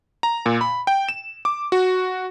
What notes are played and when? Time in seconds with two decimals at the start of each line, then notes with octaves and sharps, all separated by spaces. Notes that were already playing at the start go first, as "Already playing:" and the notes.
0.23 A#5
0.46 A#2
0.61 B5
0.87 G5
1.09 E7
1.45 D6
1.72 F#4